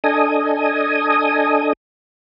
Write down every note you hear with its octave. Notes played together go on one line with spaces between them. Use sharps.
D4 A4 D#5 G#5 D#6